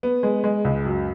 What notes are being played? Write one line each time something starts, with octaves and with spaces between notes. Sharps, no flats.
B3
G#3
G#3
C#2
F#2